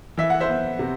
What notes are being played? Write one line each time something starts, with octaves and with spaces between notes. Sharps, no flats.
E3 E5
F#5
C5 E5
B3
C3